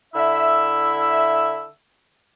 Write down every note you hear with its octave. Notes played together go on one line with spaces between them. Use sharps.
D3 E4 E5